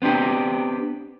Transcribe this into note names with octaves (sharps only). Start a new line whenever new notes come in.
B3 C4 D4 G4